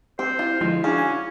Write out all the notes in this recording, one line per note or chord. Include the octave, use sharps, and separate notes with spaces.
C4 G4 C5
E4 F4
D3 F3 G#3
C#4 D4 F#4 G#4 F5
G#5